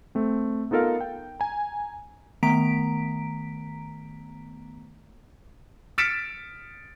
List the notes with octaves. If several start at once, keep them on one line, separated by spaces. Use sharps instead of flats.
A3 C4
B3 D#4 F4 A4 A#4 F5
G5
G#5 A#5
D#3 A3 B3 A#5 B6 D7
F6 A6 B6 C#7 D7 E7